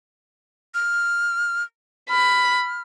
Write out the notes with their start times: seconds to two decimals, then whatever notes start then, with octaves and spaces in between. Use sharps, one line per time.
0.74 F6
2.10 B5 F6